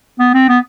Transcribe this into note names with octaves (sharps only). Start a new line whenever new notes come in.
B3
C4
B3